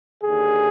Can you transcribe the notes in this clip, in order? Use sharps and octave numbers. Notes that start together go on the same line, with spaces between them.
D#2 D3 G#4